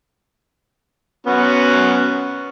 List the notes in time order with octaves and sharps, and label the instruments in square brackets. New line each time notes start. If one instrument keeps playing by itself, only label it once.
[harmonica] B3 C#4 F#4